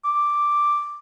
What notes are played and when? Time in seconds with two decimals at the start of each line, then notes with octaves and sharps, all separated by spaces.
0.05 D6